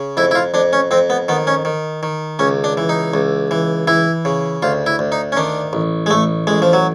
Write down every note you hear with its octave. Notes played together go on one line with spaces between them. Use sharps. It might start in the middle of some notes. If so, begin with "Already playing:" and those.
Already playing: C#3
F2 E4
E4
F4
F2 D4
C#4
F2 C4
B3
D#3 B3
C#4
D#3
D#3
C#2 C#4
D4
E3
D#4
C#2
E3
E3 E4
C#3
D2 F4
E4
D2
D#4
C#4
D#3 D4
A1
G#3
A1 A3
A1 G#3
F3
F#3